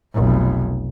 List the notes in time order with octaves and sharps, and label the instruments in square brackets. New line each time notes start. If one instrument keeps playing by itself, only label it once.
[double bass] F1 B1